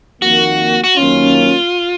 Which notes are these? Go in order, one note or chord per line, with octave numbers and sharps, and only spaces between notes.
F2 D#3 A#3 F#4
F#4
F#2 D#3 A#3 C#4 F4